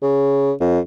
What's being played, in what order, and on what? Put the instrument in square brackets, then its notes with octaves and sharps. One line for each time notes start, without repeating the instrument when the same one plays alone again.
[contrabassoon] C#3
F2